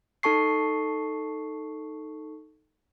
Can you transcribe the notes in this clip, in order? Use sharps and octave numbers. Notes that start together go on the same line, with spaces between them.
D#4 A4 A5 C#6 C7